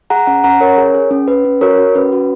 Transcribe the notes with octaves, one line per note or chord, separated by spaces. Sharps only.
G#4 F#5 A#5
C#4 F#5 A#5
C#4 F#5 A#5
C#4 A#4 C#5
G#4
G#4
C#4
C#4 B4
C#4
F#4 A#4 C#5
F#4
C#4 B4
F#4